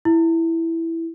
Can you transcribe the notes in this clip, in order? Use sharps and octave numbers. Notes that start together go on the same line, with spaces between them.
E4